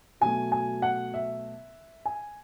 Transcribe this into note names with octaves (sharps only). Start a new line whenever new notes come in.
B2 F#3 A3 G#5
G#5
F#5
E5
G#5